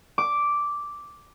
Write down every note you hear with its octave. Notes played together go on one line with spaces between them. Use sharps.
D6